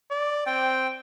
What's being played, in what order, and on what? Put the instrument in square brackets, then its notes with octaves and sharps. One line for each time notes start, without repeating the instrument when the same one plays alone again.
[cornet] D5
[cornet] C4 [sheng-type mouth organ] G5